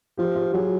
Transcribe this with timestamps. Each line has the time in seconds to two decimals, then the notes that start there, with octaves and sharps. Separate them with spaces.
0.17 F3 F4 G4
0.35 F4 G4
0.54 F#3 F#4 G#4